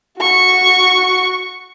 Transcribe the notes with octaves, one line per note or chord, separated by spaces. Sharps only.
F#4 C#6